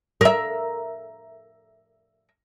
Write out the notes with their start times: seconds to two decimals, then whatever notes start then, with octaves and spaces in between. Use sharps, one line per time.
0.21 A#4 E5